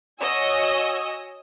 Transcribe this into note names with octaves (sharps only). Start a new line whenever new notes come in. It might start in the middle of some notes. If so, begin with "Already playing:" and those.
F#4 C#5 D#5 G#5 E6